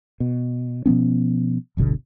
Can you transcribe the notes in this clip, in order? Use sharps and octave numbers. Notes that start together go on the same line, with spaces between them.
B2
B2 F3 B3 C#4
D1 G1 B2 D3